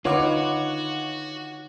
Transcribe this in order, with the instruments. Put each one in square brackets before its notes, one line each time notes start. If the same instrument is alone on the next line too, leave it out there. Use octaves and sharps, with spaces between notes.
[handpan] D3 D#4 B4 [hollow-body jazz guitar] F4 [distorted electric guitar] F#4 [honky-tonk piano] C#5 F#5 D6